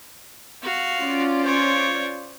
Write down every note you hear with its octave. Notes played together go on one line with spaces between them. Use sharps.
F#4 F5
C#4 F4 D5
C5 C#5